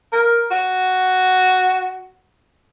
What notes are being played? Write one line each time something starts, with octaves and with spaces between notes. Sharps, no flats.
A#4
F#4